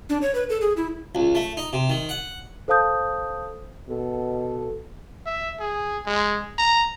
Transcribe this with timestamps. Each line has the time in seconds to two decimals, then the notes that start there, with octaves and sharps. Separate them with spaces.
0.09 D4
0.22 C#5
0.35 B4
0.50 A4
0.61 G#4
0.77 E4
1.15 C#2
1.35 A3
1.57 D#4
1.73 C3
1.89 D#3
2.09 F#5
2.68 A4 C5 F5 A5 D#6 G6
3.88 B2 A4
5.26 E5
5.60 G#4
6.06 G#3
6.58 A#5